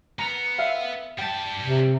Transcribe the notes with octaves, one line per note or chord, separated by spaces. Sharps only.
B3 A#5
E5 F5
G3 G5 A5
C3